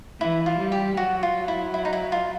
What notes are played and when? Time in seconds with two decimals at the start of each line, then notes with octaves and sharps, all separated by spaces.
0.20 E3 E4
0.46 F4
0.59 G3
0.72 G4
0.97 F#3 F#4
1.23 F4
1.48 E4
1.74 E4
1.85 D#4
1.93 E4
2.12 F4